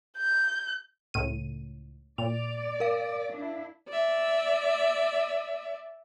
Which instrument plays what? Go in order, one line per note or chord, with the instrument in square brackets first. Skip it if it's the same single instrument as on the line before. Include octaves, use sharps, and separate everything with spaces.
[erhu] G6
[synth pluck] C#2 A2 D#7
[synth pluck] A#2 [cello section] D5 [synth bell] F7
[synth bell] A#4 F5
[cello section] D4 E4
[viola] D5 E5